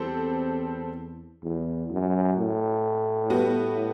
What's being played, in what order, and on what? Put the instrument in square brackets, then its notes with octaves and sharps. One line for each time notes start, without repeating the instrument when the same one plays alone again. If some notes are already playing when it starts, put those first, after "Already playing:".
Already playing: [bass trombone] E2 [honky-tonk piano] G3 C4 A4
[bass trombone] E2
F#2
A2
[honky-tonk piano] G3 B3 F#4